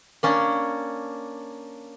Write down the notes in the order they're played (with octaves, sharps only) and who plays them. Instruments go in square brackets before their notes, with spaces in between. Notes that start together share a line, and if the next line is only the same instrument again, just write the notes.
[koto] A#3 C#4 D4